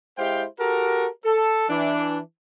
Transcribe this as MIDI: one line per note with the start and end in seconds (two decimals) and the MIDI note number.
0.18 0.45 56
0.18 0.45 64
0.18 0.45 67
0.18 0.45 72
0.18 0.45 77
0.18 0.45 79
0.59 1.07 66
0.59 1.07 67
0.59 1.07 69
0.59 1.07 70
1.25 1.66 69
1.69 2.19 52
1.69 2.19 62